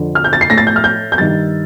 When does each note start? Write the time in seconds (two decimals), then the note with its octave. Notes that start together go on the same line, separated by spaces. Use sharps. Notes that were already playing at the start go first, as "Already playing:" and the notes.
Already playing: F2 D3
0.15 F6
0.24 G6
0.33 A6
0.41 C7
0.50 A2 A#6
0.58 A6
0.67 G6
0.76 F6
0.84 G6
1.12 G6
1.18 G2 D#3 A6